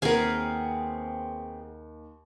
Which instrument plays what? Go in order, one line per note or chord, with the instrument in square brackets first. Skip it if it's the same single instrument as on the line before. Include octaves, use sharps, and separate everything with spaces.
[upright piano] D#2 [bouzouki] B3 C4 G#4 [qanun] A#4 G#5